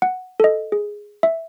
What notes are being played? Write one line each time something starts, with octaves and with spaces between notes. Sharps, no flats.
F#5
A4 D#5
G#4
E5